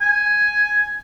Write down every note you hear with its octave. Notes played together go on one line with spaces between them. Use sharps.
G#5